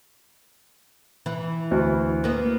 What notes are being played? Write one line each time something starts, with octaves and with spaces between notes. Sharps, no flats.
E3
D2
A#3 B3